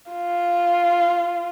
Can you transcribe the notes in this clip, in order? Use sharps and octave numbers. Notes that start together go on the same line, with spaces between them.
F4